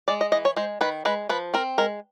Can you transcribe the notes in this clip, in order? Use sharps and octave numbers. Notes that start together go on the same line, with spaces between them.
G#3 D5
D#5
E3 D#5
C#5
G#3 C5
D#3 B4
G#3 B4
F3 B4
C4 A#4
G#3 A#4